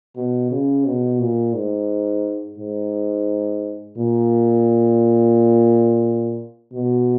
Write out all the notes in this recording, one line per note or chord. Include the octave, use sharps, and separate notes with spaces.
B2
C#3
B2
A#2
G#2
G#2
A#2
B2